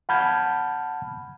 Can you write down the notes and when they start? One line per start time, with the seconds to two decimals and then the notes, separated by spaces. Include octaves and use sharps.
0.09 F#5 A5 B5 F6 G6 G#6